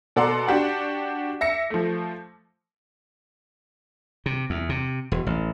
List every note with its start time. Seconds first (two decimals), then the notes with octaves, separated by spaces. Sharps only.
0.16 B2 A4 D5 F#5 A#5 C6
0.47 D4 F#4 G4 F#5
1.41 E5 A#6 C#7
1.70 F3 A3
4.26 C3
4.50 E2
4.69 C3
5.12 E1
5.26 A1